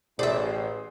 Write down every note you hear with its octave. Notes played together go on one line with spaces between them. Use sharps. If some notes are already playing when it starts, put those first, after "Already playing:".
A1 G#4 C5 D5 E5